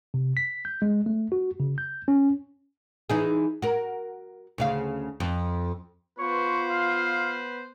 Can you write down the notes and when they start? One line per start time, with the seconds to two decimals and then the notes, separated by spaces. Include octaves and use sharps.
0.14 C3
0.37 B6
0.65 G6
0.82 G#3
1.06 A3
1.32 F#4
1.60 C#3
1.78 G6
2.08 C#4
3.10 E3 D#4 G#4
3.62 F#4 A#4
4.58 D2 C#3 F5
5.20 F2
6.19 B3 F4 B4 C5 C#6
6.71 F5